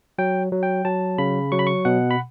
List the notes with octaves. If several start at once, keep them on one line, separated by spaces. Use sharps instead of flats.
F#3 G5
F#3
G5
F#3 A5
C#3 B5
F#3 C#6
B5
C#6
B2 F#5
B5